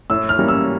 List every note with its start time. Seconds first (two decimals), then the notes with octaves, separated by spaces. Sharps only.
0.10 A2 E6
0.29 F6
0.39 E3 G3 A#3 C#4
0.48 E6